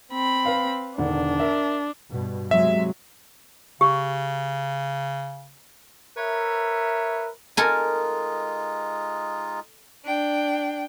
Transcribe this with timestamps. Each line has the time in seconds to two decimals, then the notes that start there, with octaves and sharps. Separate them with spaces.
0.12 C4 B5
0.45 B4 F5
0.98 E1 D3 D#3 D4
1.39 A#4 E5
2.10 G2 B2
2.51 C3 F#3 G#3 E5
3.81 C#3 G4
6.17 A#4 B4 C#5 E5
7.57 G#3 D#4 F4 A4 A#4 G#5
10.05 D4 G5